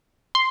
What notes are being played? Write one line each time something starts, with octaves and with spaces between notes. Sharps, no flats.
C6